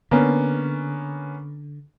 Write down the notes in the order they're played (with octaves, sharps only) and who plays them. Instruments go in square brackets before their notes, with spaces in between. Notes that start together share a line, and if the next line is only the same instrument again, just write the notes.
[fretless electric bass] D3 [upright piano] A#3 B3 C#4